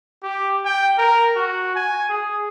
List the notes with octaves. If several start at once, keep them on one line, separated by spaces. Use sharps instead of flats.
G4
G5
A#4
F#4
G#5
G#4